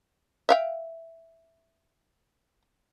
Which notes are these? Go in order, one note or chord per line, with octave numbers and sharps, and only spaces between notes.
E5 F5 G5